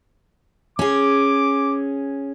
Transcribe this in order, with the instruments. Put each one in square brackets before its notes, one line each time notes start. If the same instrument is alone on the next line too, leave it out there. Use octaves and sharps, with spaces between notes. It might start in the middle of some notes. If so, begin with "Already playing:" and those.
[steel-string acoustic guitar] C#4 G#4 [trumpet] D6